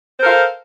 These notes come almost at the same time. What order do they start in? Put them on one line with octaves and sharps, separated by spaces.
C5 A#4 A4 F5